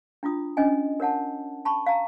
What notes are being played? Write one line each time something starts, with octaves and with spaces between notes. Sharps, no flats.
D4 E4 F4 D#6
C#4 D4 D#5 G#5
A#4 C#5 F#5 A5
A5 B5 C#6
F5 A#5